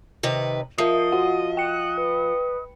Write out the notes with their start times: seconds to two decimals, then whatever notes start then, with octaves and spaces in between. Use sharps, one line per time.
0.23 C3 D#3 B4
0.78 F3 A#4 D#5 E5 C7
1.12 F#4 F#5
1.57 G5 F#6 C#7
1.98 B4